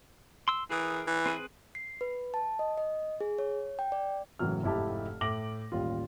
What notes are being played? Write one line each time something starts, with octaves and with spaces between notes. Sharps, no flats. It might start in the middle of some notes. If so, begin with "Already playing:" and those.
C6 E6
E3 G#4 A#4 D#6
E3
C4 G#4 B4
C7
B4
A5
D#5
D#5
G#4
C#5
G5
D5
F#1 A2 E3 F#3 F6
F1 G#2 E4 G4 A5
A2 A3 D6 A#6 F#7
A1 D#2 G3 F4